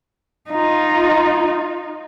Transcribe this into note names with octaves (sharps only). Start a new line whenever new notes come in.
D#4 F4